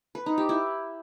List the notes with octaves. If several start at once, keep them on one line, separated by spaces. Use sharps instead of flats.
B4
D#4
G4
E4